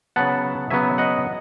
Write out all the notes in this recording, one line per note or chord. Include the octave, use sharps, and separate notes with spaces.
C#3 F#3 B3 F#5 A5
C#3 F#3 B3 E5 G#5
D#5 F#5